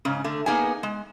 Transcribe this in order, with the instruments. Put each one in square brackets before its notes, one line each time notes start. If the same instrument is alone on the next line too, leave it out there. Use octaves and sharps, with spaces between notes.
[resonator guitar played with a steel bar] G#2 C#3 C#4
D3 A3
A#3 B3 D#4 G#4 G#5
G#3